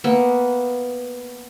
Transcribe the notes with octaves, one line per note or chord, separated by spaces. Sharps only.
A#3 B3